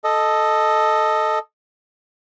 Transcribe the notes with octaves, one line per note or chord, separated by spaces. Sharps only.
A4 D#5